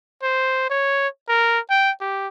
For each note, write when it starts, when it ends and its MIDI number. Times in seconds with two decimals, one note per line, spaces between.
0.23 0.66 72
0.70 1.08 73
1.28 1.59 70
1.70 1.91 79
2.00 2.28 67